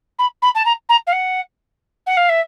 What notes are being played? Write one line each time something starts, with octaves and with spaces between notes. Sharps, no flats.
B5
B5
A5
A#5
A#5
F5
F#5
F#5
F5
E5